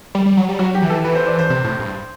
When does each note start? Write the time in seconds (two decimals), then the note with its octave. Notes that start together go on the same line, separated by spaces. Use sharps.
0.15 G3
0.26 G3
0.37 F#3
0.49 G3
0.59 F#3 F#4
0.75 G4
0.82 E3
0.90 A4
1.04 E3 B4
1.15 C5
1.27 D5
1.39 C5
1.50 C3
1.64 A2
1.79 G2